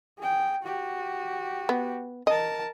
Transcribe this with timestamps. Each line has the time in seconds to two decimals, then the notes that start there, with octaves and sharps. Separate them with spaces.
0.19 G#4 G5
0.63 F#4 G4
1.69 B3
2.27 A#4 D#5 A5